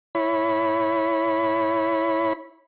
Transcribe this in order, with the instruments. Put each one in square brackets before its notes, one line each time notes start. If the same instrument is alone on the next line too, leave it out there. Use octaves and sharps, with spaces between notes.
[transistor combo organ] E4 C#5 B5